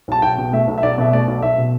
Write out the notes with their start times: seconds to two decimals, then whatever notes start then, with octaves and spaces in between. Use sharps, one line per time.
0.08 B1 A5
0.22 B1 G5
0.38 B2
0.53 A3 E5
0.67 B1
0.78 E5
0.83 B1 D5
0.98 B2 E5
1.13 A3 D5
1.27 B1
1.42 B1 E5
1.58 B2